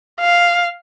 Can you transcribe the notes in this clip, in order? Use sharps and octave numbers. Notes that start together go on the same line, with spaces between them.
F5